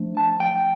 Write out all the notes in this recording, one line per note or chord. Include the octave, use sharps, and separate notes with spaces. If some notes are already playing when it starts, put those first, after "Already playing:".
Already playing: F3 A3 D4
A5
G5